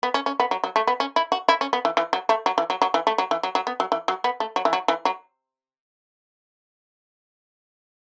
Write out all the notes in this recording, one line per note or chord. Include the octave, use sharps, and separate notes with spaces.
B3
C#4
C#4
B3
F#3
F#3
A3
B3
C#4
E4
F#4
E4
C#4
B3
E3
E3
F#3
A3
F#3
E3
F#3
F#3
E3
A3
F#3
E3
F#3
F#3
B3
F#3
E3
F#3
B3
A3
F#3
E3
F#3
E3
F#3